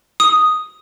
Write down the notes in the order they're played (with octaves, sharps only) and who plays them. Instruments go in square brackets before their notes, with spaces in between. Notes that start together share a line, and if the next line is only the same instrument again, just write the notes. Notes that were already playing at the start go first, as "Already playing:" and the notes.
[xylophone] D#6